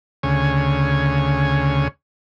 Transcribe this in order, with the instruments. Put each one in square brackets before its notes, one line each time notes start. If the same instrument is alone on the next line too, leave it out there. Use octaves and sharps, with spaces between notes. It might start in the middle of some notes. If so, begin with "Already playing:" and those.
[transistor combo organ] D2 C#3 C#5 G#5